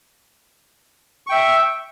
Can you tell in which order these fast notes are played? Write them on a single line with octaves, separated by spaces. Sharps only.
C#6 G5 E5